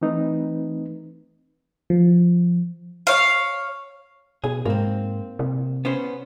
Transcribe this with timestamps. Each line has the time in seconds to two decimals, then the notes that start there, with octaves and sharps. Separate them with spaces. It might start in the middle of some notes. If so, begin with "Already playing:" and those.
0.01 E3 A3 C4 D#4 B4
1.90 F3
3.07 C#5 F5
4.44 B2 G#4
4.65 G#2 A#3 C4
5.39 C3
5.85 B3 C#4 C5